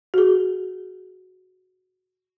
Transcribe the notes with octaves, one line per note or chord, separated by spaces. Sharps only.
F#4 G#4